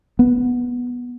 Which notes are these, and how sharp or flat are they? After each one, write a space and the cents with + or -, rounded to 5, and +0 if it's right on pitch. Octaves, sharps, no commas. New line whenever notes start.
B3 -10